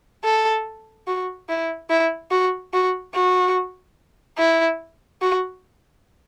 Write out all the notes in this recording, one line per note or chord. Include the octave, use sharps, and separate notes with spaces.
A4
F#4
E4
E4
F#4
F#4
F#4
E4
F#4